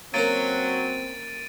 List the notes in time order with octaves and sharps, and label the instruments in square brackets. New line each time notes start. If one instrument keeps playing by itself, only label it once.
[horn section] F#3 [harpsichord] A#3 C#4 A#4 [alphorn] C4 [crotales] A6 D7 D#7